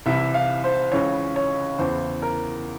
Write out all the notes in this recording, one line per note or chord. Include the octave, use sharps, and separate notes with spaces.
C2 C3 E3 E5
F5
C5
C#2 C#3 E3 C#5
C#5
E2 C#3 E3 C5
A#4